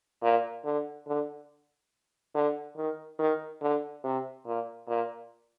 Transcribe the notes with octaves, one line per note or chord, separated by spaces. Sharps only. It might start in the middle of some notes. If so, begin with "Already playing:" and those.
A#2
D3
D3
D3
D#3
D#3
D3
C3
A#2
A#2